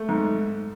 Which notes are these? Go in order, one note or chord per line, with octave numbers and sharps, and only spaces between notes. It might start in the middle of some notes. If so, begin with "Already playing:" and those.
Already playing: A3
G#2